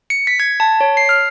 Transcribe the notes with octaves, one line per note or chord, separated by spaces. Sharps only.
C#7
B6
G#6
A5
C#5
C7
F6